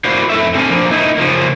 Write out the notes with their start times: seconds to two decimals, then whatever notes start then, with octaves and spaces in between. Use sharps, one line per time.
0.05 E4 F#4 A#4 C5 D5 F5
0.30 F2 E4 A4 E5
0.54 D3 C4 G4 A4 A#4 G#5
0.69 F3 A#3 D4
0.91 A#3 D#4 E4
1.18 C#3 F3 A#3